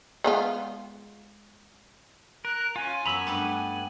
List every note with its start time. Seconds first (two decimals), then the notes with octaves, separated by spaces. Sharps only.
0.24 G#3 B3 F4
2.45 A#4 F#6
2.76 C#4 F4 G#5
3.06 F#2 B3 A#5 B5 E6
3.27 G2 G3 A3 B4 F#5